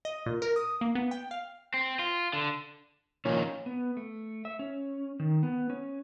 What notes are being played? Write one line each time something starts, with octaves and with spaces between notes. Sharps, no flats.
D#5
A#2
A#4
D#6
A#3
B3
G5
F5
C4
F4
D3
A#2 D#3 F3 C#4 D#4
B3
A3
E5
C#4
D#3
B3
C#4